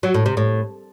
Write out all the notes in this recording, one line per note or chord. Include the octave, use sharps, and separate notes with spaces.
F#3
A2
C3
A2